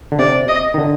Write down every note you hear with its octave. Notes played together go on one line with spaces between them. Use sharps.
D3
C3 D5
D#5
D#3
D3